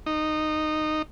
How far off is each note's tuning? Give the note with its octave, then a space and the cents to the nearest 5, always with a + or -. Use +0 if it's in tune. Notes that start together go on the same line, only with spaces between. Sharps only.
D#4 -15